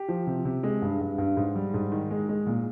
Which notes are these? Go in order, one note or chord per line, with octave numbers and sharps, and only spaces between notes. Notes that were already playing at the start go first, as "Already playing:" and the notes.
Already playing: G4
F3
C3
C3
G#3
G2
G2
G2
G#2
G3
G#2
D#3
G#3
G#3
A#2